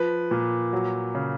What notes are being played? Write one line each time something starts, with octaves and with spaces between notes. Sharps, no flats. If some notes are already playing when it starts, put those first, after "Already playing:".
Already playing: F3 B4
A#2
F#3
C#3